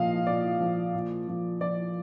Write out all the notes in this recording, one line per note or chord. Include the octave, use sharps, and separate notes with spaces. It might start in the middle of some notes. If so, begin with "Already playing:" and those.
Already playing: A#2 F3 D#5 F5
A#2 D5
F3
A#2
F3
F3 D5